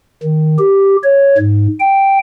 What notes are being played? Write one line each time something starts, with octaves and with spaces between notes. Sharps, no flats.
D#3
G4
C#5
G#2
G5